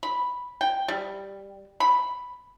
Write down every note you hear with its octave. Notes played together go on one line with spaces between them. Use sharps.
B5
G5
G3
B5